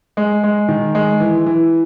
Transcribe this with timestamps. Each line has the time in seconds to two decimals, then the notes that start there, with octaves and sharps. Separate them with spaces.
0.17 G#3
0.44 G#3
0.69 D#3
0.95 G#3
1.20 E3
1.46 E3